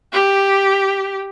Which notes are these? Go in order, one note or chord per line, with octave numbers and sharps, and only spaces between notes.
G4